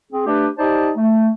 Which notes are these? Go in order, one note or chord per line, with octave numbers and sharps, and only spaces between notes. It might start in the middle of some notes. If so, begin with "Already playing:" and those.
C4 G#4
A3 D4 G4 B4 D5
D#4 G4 C5 D5 A5
A3